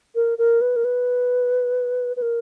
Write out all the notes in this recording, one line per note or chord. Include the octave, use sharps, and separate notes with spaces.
A#4
A#4
B4
A#4
B4
B4
A#4